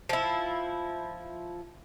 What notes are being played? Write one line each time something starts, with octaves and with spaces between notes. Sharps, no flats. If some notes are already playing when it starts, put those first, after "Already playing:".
F3 E4